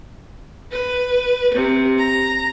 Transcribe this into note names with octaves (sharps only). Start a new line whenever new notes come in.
B4
C3
A#5